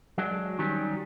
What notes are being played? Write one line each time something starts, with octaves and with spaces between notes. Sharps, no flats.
F#3 G#3 D4
D#3 F#3 G3 C#4